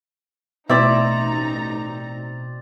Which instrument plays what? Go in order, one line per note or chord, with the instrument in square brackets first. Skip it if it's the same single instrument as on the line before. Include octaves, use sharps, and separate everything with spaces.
[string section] A1 D#4 A#5 [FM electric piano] B2 [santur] C4 D5 [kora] E4 E5